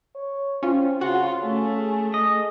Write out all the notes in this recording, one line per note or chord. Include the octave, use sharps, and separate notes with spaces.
C#5
C4 C#4 F4
C#3 F4 F#4 F#5
A3 C#4
G#4
D#5